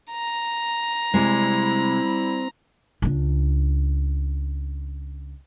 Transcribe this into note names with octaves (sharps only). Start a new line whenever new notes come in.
A#5
C3 G3 G#3 C4 E4
C#2 D4